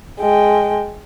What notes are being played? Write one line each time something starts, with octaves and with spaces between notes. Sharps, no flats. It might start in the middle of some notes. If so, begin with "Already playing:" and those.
G#3 G5